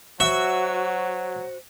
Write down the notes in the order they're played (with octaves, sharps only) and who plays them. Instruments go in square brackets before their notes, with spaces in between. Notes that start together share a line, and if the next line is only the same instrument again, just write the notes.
[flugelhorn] F#3 [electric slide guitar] F#4 [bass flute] C5 [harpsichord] E5